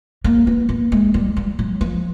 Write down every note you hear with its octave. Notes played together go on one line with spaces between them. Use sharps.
A#3
B3
A#3
G#3
G3
G3
F#3
F3